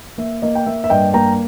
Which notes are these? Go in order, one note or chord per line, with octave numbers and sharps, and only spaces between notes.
A#3 E5
A#3 D#5
G5
A#3 E5
E5
G2 D#5 G5
A#3 G5 A#5